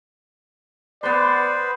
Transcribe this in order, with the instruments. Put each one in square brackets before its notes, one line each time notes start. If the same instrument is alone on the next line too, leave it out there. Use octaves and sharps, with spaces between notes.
[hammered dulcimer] B3 C6 [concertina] B4 C5 [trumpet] D5